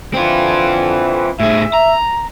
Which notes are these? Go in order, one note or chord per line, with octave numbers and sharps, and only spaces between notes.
D3 E3 C4 F4
A2 G#4 E5
A#5